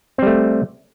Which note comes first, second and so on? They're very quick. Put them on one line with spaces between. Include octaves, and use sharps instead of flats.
C4 G3 A3